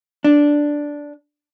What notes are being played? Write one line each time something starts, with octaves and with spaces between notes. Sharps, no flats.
D4